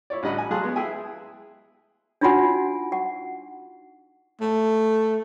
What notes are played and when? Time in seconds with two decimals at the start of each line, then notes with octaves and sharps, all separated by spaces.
0.10 E4 C#5 D5
0.23 A1 D3 G3 D#5 F#5 B5
0.38 G#5
0.51 F#3 G#4 F5 A5 C6 F#6
0.63 G#3 B3
0.76 E4 G#4 E5 G5 G#5
2.21 D4 D#4 F4 F#4 F#5 G#5
2.92 F#5
4.41 A3